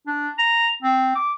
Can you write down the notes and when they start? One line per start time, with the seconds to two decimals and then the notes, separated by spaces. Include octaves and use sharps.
0.07 D4
0.39 A#5
0.82 C4
1.15 D6